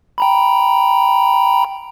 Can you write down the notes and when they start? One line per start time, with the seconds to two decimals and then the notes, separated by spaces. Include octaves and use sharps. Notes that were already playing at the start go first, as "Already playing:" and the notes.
0.18 G5 A#5 B5